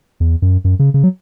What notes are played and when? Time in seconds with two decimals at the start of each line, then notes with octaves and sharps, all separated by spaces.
0.20 E2
0.42 F#2
0.64 F#2
0.79 C#3
0.94 C#3
1.03 F#3